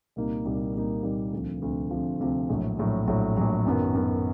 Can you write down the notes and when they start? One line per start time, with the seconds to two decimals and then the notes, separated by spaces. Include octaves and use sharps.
0.16 C2 A#2 G3 A#3 D#4
0.45 C2 A#2 G3 A#3 D#4
0.74 C2 A#2 G3 A#3 D#4
1.03 C2 A#2 G3 A#3 D#4
1.32 D2 C3 F3
1.62 D2 C3 F3
1.91 D2 C3 F3
2.20 D2 C3 F3
2.49 A#1 A2 F#3
2.78 A#1 A2 F#3
3.07 A#1 A2 F#3
3.37 A#1 A2 F#3
3.66 F#2 D#3 F#3 B3
3.94 F#2 D#3 F#3 B3